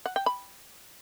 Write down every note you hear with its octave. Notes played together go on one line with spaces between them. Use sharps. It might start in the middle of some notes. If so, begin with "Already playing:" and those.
F#5
G5
B5